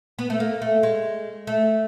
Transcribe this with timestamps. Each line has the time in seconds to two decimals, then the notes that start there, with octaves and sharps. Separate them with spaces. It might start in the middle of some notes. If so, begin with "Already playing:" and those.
0.19 B3
0.30 A3
0.40 A#3
0.62 A3
0.83 G#3
1.47 A3